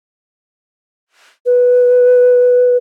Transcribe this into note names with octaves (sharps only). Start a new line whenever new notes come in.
B4